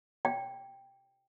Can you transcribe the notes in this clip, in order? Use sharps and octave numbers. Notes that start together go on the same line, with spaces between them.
G5